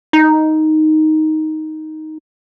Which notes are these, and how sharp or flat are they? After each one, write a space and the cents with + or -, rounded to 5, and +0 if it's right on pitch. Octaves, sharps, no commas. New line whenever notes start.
D#4 +5